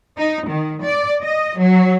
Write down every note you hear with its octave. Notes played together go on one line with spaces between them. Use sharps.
D#4
D#3
D5
D#5
F#3